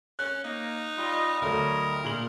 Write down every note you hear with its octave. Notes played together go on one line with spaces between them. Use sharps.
C#4 F#6
A#3 D#4
G3 F4 D#5
D2 D3 F#3 A#4
A#2 G#4 F#7